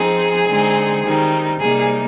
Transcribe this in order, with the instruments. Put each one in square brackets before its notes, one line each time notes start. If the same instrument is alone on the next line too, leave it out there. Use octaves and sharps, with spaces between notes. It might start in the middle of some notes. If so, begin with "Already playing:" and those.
Already playing: [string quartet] F3 C4 D#4 G#4
D3 G#3 C4 D#4
D#3 G3 C4 D#4
C3 G3 A#3 D#4 G#4